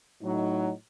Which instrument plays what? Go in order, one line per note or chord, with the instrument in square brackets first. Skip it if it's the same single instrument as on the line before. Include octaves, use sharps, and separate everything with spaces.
[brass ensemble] A2 F#3 D#4